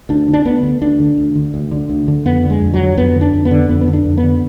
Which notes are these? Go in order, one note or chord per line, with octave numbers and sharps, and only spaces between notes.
D2 D4
D3
D4
D2 B3
D3
D2 D4
D3
D2
D3
D2
D3
D2
D3
F2 B3
D3
G#3
F2
F#3
D3
F2 B3
D3
D4
F2
B3
D3
F2 B3
B3
D3
D4
F2
B3
D3